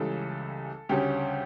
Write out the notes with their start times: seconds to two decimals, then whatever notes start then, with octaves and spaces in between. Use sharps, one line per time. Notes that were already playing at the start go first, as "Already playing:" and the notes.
Already playing: C#2 C#3 E3 G3 A4
0.89 D2 C#3 G3 C#4 G4